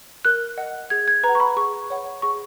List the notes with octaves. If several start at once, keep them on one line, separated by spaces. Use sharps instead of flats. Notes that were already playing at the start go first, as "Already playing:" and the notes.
A#4 F#6
D#5 F#5
G#4 G#6
G#6
B4 A#5
F#5
C#6
B5
G#4 C#6
C#5 F#5
G#4 C#6